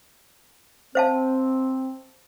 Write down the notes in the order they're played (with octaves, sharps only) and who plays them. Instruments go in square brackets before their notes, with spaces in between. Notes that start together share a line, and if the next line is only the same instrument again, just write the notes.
[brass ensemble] C4 [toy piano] C5 F5 A5